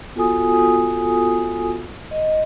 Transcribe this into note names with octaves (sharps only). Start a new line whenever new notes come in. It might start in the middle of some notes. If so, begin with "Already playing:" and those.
B3 F4 F#4 A4 G#5 D#6
D#5